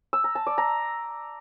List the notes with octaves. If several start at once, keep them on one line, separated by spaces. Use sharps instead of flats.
E6
A#5
A5
D5
A#5